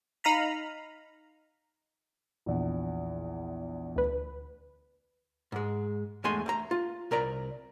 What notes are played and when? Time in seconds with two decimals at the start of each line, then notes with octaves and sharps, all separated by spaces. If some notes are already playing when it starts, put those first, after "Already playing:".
0.24 D#4 F5 A#5 B5
2.46 A#1 E2
3.96 D2 B4
5.52 G#2 G#3
6.24 E2 G#3 A3 G#5 C6
6.46 A3 A#5
6.71 F4
7.11 C2 A#4 D5 A#5